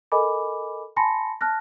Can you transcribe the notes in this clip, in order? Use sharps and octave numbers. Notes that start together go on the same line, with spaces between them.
A4 A#4 D#5 G#5 B5 D6
G#5 A5 B5 C6 A#6 C#7
A5 F6 F#6 A#6